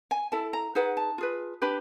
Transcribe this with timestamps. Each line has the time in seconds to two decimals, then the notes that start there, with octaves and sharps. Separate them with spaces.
0.11 G#5
0.32 E4 A4 A5
0.53 A#5
0.75 D#4 G#4 B4 F#5
0.97 A5
1.18 F4 G#4 B4
1.62 D4 G4 B4 B5